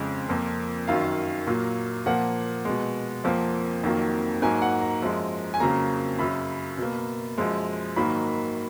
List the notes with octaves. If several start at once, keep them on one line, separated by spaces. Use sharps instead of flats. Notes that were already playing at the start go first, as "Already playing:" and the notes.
Already playing: F2 C#3 G#3
F2 F3 A#3
F#2 D#3 F#3 F5
A#2 F#3 A#3
A#2 F3 A#3 F#5
B2 G#3
F2 F3 A#3
F2 D#3 F#3 A#3
G#2 F#3 A#3 G#5
F#5
A#5
F#2 F3 G#3
G#5
F2 C#3 F#3 A#3 A#5
F#2 C#3 F#3 B5
B2 A#3
F#2 F3 G#3
G#2 D#3 F#3 A#3 B5